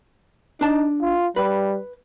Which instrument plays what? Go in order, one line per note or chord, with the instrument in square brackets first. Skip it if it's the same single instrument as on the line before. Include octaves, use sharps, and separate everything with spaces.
[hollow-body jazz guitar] D4 A5 [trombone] D#4
[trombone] F4
[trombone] G3 [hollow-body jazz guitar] B4